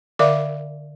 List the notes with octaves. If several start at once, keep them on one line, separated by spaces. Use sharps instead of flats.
D3 A#4 D5 E5 F5 D6